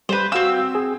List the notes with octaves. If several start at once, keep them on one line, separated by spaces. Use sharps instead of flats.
G3 B4 C5
C4 F#4 F5 E6
G#4